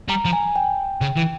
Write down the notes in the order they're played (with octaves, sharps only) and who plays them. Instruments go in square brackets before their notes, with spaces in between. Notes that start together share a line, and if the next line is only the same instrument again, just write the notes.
[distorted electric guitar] G3 [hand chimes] A#5
[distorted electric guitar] F3
[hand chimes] G#5
G5
[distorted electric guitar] C#3
E3